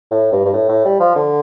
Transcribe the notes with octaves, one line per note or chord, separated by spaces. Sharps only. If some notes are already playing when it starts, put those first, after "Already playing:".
A2
G2
G2
A2
A2
G3
F3
D3